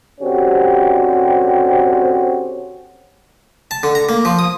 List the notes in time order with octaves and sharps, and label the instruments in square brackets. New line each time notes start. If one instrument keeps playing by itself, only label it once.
[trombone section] D3 C4 C#4 F#4 G4
[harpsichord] A5
D3
A#5
A#3
F3
D#6